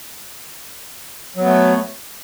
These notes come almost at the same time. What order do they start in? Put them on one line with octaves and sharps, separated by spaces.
F#3 B3 A3